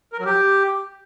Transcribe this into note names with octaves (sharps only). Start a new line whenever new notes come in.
A#4
F#3
G4